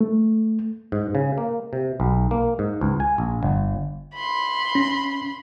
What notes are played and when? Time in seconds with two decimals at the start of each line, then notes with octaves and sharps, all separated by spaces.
0.01 A3
0.92 G#2
1.15 C#3
1.38 A#3
1.73 C3
2.00 B1
2.31 A#3
2.59 G#2
2.81 C#2
3.00 G#5
3.18 A#1
3.43 G1
4.15 B5 C6
4.75 C#4